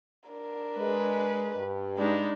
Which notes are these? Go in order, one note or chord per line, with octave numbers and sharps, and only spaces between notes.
D4 A#4
G#3 B4
G2
G#3 D4 D#4 B5